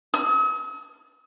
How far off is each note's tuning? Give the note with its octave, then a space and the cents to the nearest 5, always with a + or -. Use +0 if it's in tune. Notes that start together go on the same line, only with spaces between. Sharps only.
D#6 +45